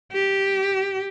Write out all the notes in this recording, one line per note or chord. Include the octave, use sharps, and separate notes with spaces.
G4